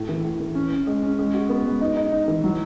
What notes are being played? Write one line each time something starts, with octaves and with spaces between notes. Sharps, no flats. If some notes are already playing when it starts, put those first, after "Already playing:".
Already playing: A2
E3
A2
E3
C#4
C#4
G#3
C#4
G#3
F#4
B3
G#3
D#4
D#4
D#4
E3
F#3